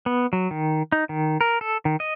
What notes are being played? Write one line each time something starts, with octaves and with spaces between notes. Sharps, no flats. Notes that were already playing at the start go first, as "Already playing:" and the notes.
B3
F#3
D#3
D#4
D#3
A#4
A4
D#3
D#5